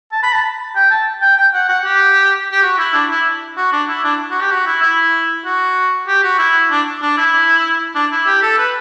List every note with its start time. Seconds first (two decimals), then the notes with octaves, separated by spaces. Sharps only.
0.12 A5
0.23 B5
0.33 A5
0.75 G5
0.90 A5
1.22 G5
1.37 G5
1.54 F#5
1.69 F#5
1.85 G4
2.52 G4
2.62 F#4
2.78 E4
2.94 D4
3.11 E4
3.57 F#4
3.72 D4
3.89 E4
4.04 D4
4.31 F#4
4.41 G4
4.51 F#4
4.67 E4
4.82 E4
5.45 F#4
6.08 G4
6.23 F#4
6.39 E4
6.71 D4
7.02 D4
7.18 E4
7.95 D4
8.12 E4
8.26 G4
8.43 A4
8.58 B4